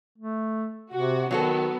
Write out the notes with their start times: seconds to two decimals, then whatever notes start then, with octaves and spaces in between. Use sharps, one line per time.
0.18 A3
0.94 C3 F#4
1.31 D#3 F#3 B3 F#4 A4